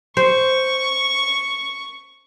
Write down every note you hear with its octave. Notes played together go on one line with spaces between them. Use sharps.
C5 C#6